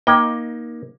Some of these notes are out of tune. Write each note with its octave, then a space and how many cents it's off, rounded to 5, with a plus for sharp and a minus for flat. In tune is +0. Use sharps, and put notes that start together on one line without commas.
A#3 +20 D#4 +5 G5 +0